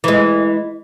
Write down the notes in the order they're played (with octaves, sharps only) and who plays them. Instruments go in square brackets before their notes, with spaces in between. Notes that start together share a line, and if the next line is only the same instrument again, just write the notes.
[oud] E3 G#3